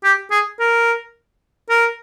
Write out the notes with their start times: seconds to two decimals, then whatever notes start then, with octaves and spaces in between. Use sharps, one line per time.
0.04 G4
0.31 G#4
0.59 A#4
1.69 A#4